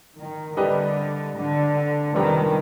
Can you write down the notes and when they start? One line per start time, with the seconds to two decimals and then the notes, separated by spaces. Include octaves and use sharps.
0.18 D#3
0.57 D3 G3 D4 G4 B4 D#5
1.36 D3
2.15 F2 C3 D#3 G3 B3